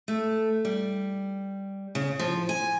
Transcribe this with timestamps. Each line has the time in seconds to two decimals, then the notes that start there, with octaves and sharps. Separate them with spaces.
0.08 A3
0.65 G3
1.95 C#3
2.19 F3
2.49 G#5